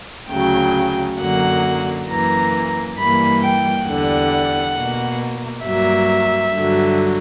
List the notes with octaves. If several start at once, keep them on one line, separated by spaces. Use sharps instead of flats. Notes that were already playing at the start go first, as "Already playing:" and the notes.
D2 C#3 F#3 G5
F#2 D3 F#3 A#3 F#5
F#2 E3 A#3 A#5
G2 E3 G3 A#3 B5
G5
E2 D3 G3 F#5
B2 A#3
G2 F#3 A#3 E5
G2 D3 F#3